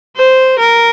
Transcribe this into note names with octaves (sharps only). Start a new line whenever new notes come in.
C5
A#4